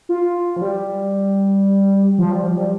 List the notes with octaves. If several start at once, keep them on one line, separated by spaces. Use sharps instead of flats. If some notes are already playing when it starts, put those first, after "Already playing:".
F4
F3
G3
F3
G3
F3
G3